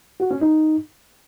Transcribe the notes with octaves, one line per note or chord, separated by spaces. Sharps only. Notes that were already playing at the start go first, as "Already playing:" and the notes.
F#4
C#4
D#4